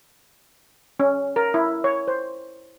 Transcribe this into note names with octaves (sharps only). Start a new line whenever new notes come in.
C#4
A#4
E4
C#5
C5